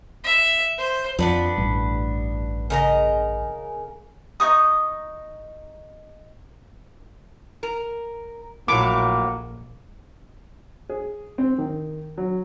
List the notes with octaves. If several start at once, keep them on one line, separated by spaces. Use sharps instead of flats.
E5
C5
F2 F3 B3 D4 B4
A1 G2
C#3 A#4 D#5
D#4 C#5 C#6 D#6
A#4
A#1 A2 F#3 A#3 D6
G#4
C4
D#3
F#3